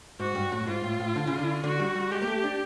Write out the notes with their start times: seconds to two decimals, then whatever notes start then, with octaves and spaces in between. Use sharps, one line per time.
0.20 G#2 F#4
0.35 G2
0.52 A2
0.67 G#2 F4
0.84 A2
1.00 A2
1.16 D3
1.27 C#3
1.39 D3
1.64 D3 F#4
1.80 G3
1.95 G3
2.12 G#3 G4
2.22 A#3
2.27 A3
2.44 D4